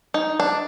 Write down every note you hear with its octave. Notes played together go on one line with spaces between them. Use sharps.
D#4
D4